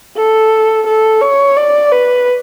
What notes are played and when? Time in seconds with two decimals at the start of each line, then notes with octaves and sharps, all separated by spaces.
0.16 A4
0.86 A4
1.21 C#5
1.56 D5
1.91 B4